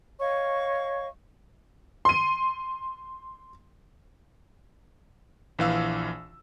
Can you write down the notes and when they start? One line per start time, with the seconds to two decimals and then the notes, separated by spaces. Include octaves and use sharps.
0.19 C#5 D#5 F5 C#6
2.05 C6 D#7
5.59 A#1 E3 F5 E6